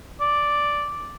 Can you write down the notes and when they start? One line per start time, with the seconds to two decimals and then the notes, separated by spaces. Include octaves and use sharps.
0.21 D5